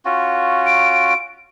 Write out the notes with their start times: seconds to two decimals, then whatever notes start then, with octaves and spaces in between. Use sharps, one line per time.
0.05 C#4 F4 F#4
0.66 D7